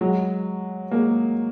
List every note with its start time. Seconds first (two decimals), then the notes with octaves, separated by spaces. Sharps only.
0.01 F#3 G#3
0.91 G#3 A#3